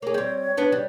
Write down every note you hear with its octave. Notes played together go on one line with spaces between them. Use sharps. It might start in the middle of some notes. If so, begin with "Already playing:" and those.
A#3 G#4 C#5
G3 C4
B3 D4
G3